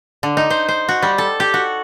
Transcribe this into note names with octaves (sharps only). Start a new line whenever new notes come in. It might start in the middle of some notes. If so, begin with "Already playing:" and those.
D3
D#4
C5
C5
F#4
G3
A4
G4
F#4